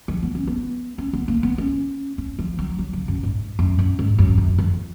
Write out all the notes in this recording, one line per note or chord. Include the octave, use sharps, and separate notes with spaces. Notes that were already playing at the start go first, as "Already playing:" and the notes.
F3
B3
C#4
B3
C#4
B3
A#3
B3
C#4
C#4
F3
F#3
F#3
C#3
F#2
G#2
F#2
F#2
G#2
F#2
F#2
F2